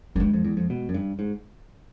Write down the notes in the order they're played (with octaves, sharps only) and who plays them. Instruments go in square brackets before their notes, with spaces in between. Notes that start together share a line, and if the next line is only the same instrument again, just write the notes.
[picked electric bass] F#2 [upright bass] A3
[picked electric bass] G2 [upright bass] G#3
[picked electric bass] F2
E2
F2
B2
F#2
G2
G#2